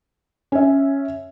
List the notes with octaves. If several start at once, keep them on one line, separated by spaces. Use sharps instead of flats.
C#4 E5